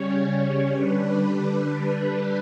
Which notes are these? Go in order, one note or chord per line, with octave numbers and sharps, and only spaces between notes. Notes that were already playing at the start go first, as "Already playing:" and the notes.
Already playing: C#3 G3 C#4 C#5
D3 G3 D4 B4